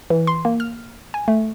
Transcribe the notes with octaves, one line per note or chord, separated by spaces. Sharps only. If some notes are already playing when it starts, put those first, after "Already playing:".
E3
C6
A#3
F6
G#5
A3